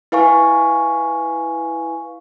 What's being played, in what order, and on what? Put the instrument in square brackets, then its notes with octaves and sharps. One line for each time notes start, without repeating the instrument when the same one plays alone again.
[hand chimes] E4 B4 F5 G#5 C#6